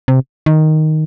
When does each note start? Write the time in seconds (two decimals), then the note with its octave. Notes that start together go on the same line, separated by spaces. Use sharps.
0.08 C3
0.46 D#3